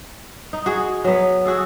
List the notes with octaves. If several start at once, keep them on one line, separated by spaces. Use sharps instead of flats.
D#4
F#4 G#4
F#3 B3
F#4 G#4 A4